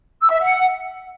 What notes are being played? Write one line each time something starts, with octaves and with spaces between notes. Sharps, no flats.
E6
E5
F#5